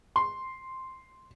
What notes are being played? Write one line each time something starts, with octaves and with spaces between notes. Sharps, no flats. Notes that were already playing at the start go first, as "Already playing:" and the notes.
C6